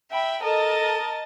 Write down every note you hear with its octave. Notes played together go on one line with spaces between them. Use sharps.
E5 G5 B5
A4 A#4 D#5 A5 A6